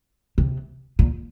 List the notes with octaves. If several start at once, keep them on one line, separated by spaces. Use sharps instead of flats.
C3
A#2